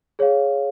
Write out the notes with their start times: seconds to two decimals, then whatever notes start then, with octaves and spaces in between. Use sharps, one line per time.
0.19 G#4 C#5 F5